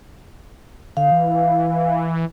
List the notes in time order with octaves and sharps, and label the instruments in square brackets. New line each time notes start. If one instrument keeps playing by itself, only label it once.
[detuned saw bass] D3 [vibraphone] F5
[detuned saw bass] E3